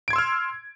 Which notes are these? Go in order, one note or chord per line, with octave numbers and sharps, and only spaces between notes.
C6 E6 F6 G#6 D7